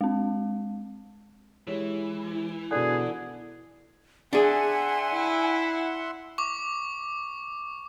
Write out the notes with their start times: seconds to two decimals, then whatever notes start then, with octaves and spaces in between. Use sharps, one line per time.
0.01 G#3 C4
1.67 E3 G#3 G4 C#5
2.71 B2 D3 G#4 D5 F#6
4.33 D4 G#4 E5 F#5 G#5 C6
5.12 E4
6.38 C#6 D6